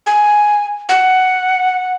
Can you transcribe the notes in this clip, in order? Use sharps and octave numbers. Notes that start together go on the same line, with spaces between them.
G#5
F#5